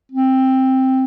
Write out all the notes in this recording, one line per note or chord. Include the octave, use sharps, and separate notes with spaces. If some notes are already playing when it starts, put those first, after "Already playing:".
C4